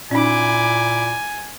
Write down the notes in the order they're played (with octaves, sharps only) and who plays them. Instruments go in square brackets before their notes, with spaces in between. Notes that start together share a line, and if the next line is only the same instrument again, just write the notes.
[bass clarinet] A#2 [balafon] C#4 D#4 [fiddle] E4 D6 [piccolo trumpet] G#5